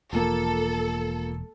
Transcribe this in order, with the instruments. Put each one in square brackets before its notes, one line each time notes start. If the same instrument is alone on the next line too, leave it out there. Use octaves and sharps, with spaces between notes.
[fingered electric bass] E1 [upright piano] F3 A#3 [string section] A4